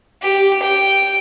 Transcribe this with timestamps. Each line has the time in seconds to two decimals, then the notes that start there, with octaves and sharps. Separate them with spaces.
0.23 G4
0.63 G5